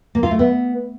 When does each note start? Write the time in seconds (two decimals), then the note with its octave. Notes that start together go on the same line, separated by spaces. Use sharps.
0.15 A#3
0.23 F4
0.31 A3
0.39 B3